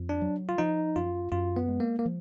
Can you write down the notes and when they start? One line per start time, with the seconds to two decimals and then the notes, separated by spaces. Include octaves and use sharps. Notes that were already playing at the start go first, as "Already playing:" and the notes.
Already playing: F2
0.09 D4
0.22 F#3
0.49 F4
0.58 F3 D#4
0.96 F#2 F4
1.32 F#2 F4
1.56 B3
1.68 G#3
1.80 A#3
1.99 A#3
2.05 F3